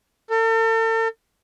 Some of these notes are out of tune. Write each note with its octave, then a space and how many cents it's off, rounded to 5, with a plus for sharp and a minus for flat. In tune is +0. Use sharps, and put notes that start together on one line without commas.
A4 +40